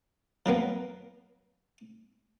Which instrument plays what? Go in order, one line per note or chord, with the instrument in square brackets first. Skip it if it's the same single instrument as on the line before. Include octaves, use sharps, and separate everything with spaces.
[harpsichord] F3 F#3 A#3 B3